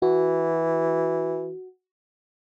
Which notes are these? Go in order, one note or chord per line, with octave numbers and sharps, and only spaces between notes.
E3 F#4